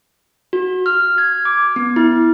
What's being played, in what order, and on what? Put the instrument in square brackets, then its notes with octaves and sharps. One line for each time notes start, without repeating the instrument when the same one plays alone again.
[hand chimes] F#4
F6
G#6
D6
B3
E4